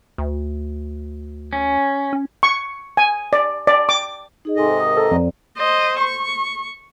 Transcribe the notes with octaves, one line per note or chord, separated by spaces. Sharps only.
D2
C#4
C#4
C#6
G#5
D5
D5
D6
D#4 G#4 D#5
G#2 C3 A4 D#5 G#5 C6
A#4 D#6
A4 B4 A#5
F2 D5
C5 D#5
C#6